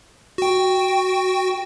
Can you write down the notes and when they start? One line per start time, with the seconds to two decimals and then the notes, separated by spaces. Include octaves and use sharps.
0.38 F#4 G5